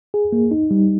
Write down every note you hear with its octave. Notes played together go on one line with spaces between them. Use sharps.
G#4
A#3
D#4
G3